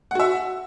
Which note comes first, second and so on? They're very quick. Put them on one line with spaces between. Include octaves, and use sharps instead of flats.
F#5 F#4 E5